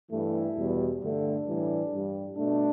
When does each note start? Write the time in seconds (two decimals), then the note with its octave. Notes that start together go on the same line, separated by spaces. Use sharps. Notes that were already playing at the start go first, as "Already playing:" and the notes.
0.11 G2 E3 A3 E4
0.57 E2 B2 G3
1.02 G2 D3 A3 D4
1.47 A2 E3 G3
1.92 G2 G3
2.37 B2 A3 D4